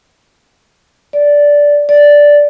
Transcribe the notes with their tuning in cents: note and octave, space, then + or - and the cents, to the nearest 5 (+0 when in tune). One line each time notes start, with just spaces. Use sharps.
D5 -10
D5 -5